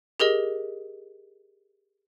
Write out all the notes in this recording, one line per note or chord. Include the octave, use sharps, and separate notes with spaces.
G4 G#4 A#4 D#5